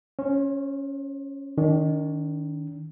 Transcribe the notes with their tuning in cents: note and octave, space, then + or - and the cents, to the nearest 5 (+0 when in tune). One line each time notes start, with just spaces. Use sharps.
C#4 +0 C5 +40
D#3 +0 D4 -45